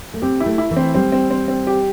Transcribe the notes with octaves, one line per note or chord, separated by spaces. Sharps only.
A3
C4 G4
E4
A3
E4
E3
C4
G3 C4
C4
C4
C4
G4